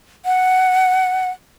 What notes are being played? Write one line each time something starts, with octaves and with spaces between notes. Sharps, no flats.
F#5